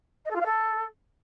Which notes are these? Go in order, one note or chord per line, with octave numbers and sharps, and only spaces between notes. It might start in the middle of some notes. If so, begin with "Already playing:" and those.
D#5
A4
F4
F5
A4